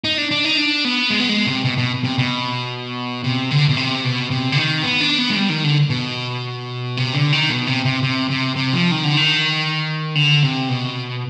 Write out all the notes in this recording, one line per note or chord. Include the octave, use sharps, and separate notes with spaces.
D#4
D4
D4
D#4
D4
B3
G#3
B3
G#3
C3
B2
B2
C3
B2
C3
D3
B2
C3
B2
C3
D3
D#3
B3
D4
B3
G#3
G3
D#3
D3
B2
C3
D3
D#3
B2
C3
C3
C3
C3
C3
F3
D#3
D3
D#3
D3
C3
B2